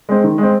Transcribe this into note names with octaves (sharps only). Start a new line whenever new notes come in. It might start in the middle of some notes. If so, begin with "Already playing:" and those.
G#3 C4
D#3
G#3
C4